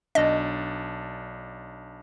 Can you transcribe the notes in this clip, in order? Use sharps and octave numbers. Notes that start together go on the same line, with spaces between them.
B1 D4 D#5